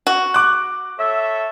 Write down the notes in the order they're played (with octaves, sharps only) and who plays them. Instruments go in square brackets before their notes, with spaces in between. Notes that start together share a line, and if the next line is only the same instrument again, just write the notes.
[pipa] F#4
[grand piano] D6 F#6
[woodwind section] A4 C#5 E5